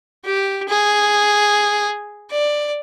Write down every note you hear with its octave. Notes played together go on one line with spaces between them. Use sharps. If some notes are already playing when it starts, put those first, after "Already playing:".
G4
G#4
D5